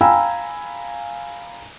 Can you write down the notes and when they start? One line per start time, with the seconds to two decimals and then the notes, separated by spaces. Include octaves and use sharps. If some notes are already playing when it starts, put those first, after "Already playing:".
0.01 F5 G5 G#5 A#5 B5 E6